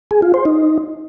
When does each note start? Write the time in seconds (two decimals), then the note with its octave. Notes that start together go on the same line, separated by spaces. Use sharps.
0.11 G#4
0.22 F4
0.34 C5
0.45 D#4